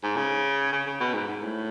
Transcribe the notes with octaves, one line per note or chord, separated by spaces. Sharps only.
G#2
C#3
C#3
C#3
B2
G#2
G#2
A2